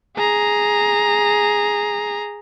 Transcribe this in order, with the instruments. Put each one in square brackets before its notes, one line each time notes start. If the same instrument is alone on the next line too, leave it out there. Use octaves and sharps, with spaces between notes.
[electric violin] G#4 A#5